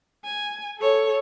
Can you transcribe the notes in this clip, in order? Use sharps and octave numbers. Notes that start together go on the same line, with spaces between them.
G#5
A4 C#5